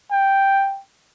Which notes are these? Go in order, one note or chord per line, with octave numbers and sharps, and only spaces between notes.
G5